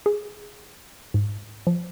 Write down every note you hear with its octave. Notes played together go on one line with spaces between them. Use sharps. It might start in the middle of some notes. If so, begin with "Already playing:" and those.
G#4
G#2
F3